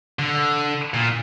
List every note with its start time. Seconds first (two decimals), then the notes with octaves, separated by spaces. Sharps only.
0.19 D3
0.94 A#2